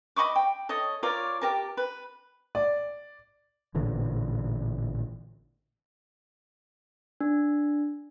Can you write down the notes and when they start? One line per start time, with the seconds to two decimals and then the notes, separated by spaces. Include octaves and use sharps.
0.16 D#5 B5 C#6 D6
0.36 G5
0.69 A4 C#5 D#5 D#6
1.03 F4 A#4 C#5 D5
1.41 G4 A#4 A5
1.77 B4
2.55 D5
3.75 A1 A#2 D3 E3
7.21 D4